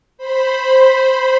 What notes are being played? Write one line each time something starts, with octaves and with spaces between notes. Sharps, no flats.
C5 B5